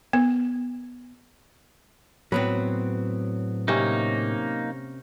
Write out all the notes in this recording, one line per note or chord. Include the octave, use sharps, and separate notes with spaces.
B3
A2 F#3 B3 C4 B4
C3 A#3 C#4 D#4